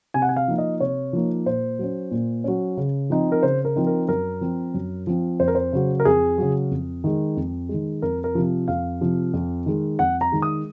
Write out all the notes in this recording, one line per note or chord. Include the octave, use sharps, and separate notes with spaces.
C3 G#5
F#5
G#5
F5
F3 A#3 D#4
D#5
C3 C#5
F3 A#3 D#4
A#2 C5
F#3 C#4
A#2
F#3 C#4
C#3
F3 C4 D#4
A#4
C#3 C5
A#4
F3 C4 D#4
A#4
F#2 A#4
F3 C4
F#2
F3 C4
F2 C5
A#4
C5
C#3 F#3
A#4
F2 G#4
C#3 F#3
F2
D#3 G#3
F2
D#3 G#3
F2 A#4
A#4
C3 F3
F2 F5
C3 F3
F2
D#3 G#3
F2 F#5
A#5
D#3 G#3
D#6